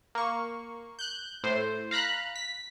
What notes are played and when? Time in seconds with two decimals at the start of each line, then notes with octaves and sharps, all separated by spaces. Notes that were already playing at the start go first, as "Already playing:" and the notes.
0.15 A#3 C#6
0.99 F#6 G6
1.44 A2 C5
1.91 F5 A#5 B5 F#6
2.36 B6